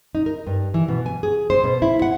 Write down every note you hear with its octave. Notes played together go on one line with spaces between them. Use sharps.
D#4
A#4
G2
E3
B2
G#5
G#4
C5
B2
E4
F#5